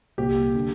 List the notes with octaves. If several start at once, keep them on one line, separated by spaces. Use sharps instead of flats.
C2 A#2 G4
D3